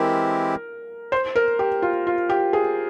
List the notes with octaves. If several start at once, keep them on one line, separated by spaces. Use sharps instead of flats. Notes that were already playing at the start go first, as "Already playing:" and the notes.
Already playing: E3 G#3 C4 E4 G4 A#4
C5
A#4
G4
F4
F4
G4
G#4